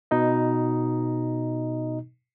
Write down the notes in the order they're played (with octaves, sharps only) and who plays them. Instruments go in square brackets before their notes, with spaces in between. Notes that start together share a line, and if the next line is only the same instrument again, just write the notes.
[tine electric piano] B2 D#4 D#5